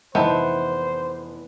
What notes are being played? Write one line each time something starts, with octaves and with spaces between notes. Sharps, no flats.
F1 E3 B3 D#4 C5 E5 A5